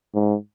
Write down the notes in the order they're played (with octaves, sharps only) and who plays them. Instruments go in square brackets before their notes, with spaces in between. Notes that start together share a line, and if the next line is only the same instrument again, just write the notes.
[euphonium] G#2